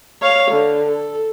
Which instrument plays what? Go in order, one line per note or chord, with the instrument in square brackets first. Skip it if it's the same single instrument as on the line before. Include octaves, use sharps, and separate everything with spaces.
[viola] C#5 F5
D3
A4